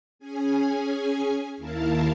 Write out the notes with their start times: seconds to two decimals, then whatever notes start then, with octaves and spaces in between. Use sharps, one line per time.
0.19 C#4 G#4 G#5
1.57 D#2 E4 A#4 F5 A5